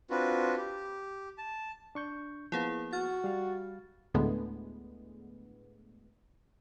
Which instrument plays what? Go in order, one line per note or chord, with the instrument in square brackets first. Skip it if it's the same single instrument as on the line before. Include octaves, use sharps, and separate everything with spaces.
[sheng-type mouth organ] C4 D4 F4 F#4 B4
G4
A5
[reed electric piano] D4 C#6 G6
[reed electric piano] F3 A#3 B3 [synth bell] E4 G#4 F5
[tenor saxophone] F#4 [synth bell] F6 A6
[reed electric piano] G3 F5
[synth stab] D2 A2 D3 G#3 B3